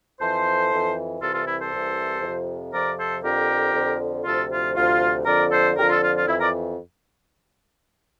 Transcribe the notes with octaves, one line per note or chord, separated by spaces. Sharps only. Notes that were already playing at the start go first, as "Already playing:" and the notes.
F2 E3 A4 C5
F2 E3
C2 C3 E3 F4 A4
F4 A4
E4
A4 C5
C2 C3 E3
F2 C3 F3
F2 C3 F3 A#4 D5
A4 C5
F2 D3 F3 G4 A#4
F2 D3 F3
D2 C3 F3 F4 A4
F4
D2 C3 F3 F4
F2 D3 F3 A#4 D5
A4 C5
F2 D3 F3 G4 A#4
F4 A4
F4
F4
F2 E3 E4
A#4 D5